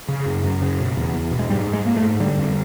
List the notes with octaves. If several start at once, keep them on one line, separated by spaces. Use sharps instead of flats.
C#3
F#2
F#2
C#3
B2
E2
E2
B2
G#3
G#2 G3
G#2
G#3
G#2 A#3
A3
G#2
D3 G3
F2